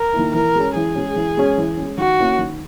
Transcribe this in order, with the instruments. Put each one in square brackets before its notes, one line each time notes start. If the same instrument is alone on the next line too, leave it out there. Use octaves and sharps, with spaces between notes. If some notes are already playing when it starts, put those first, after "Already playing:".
Already playing: [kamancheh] A#4
[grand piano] D#3 A#3 E4
[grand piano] E3 [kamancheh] A#4
[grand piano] G#3 C#4
[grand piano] E3 [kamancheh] G#4
[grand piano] G#3 C#4
E3
G#3 C#4
E3
C#4
G#3
[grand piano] D#3 [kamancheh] F#4
[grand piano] A#3 C#4 E4
D#3